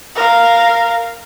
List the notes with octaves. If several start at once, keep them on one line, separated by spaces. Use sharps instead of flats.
A#4 F5